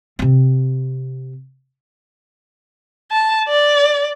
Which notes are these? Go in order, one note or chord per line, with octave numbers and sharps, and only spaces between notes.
C3 C4
A5
D5